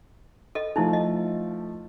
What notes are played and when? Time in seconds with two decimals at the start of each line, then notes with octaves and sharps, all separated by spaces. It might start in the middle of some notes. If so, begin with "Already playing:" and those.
0.55 A4 D#5
0.76 F3 A3 D#4 E4
0.93 D#5